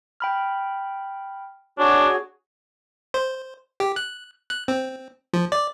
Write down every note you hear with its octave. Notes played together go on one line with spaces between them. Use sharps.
G5 B5 F6
D4 F#4 G#4 C#5
C5
G4
F#6
F#6
C4
F3
D5